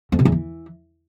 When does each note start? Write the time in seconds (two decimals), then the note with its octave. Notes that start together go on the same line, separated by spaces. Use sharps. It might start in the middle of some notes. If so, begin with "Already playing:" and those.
0.12 F2
0.19 C3
0.25 E2
0.32 E3